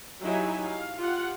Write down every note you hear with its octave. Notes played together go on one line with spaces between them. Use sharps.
F#3 D#4 E4 G4 E5 G#5
F5
F4 G4 F#5